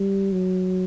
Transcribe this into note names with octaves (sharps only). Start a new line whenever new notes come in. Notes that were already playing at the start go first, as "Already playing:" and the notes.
Already playing: G3
F#3